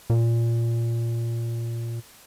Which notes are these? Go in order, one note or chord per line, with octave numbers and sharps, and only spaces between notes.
A#2